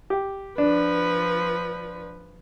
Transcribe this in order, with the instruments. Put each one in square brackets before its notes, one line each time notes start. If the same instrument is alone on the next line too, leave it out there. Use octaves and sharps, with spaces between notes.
[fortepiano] G4
[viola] F3 B4 [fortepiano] D4